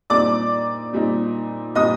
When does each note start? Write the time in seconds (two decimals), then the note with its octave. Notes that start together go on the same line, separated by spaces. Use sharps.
0.10 A#2 G3 C4 D#4 D5 D6
0.93 A#2 G3 C4 D#4
1.75 A#2 G3 C4 D#4 D#5 D#6